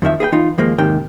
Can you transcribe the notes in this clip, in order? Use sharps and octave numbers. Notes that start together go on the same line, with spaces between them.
F2 D#3 F3 E5
G#4 B4 E5 G5
E3 D#4 F4
D#2 F3 G#3 A#3
D#2 G#2 C3 D#3 G5